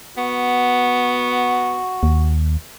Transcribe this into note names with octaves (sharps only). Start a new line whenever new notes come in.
B3 F#4
D#2